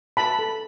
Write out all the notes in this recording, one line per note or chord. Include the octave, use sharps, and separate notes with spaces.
F#4 A5 B5
A4